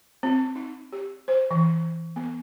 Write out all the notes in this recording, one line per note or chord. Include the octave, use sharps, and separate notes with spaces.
C4
D#4
G4
C5
E3
B3